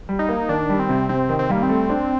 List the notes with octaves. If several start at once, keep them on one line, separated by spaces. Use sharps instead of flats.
G3
D#4
A#3
D#3 D4
G3
C4
C3
C3 C4
D#3
C4
G3 A#3
C4
A3
D4